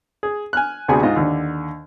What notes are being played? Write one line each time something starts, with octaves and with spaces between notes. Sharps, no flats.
G#4
G#5 F6 F#6
D2 C3 B3 F#4 G#4 G#5
G#2 F4 D#5
D#2 D3